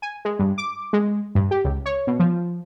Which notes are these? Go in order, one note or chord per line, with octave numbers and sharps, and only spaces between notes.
G#5
G#3
G2
D6
G#3
G2
G4
C#2
C#5
B2
F3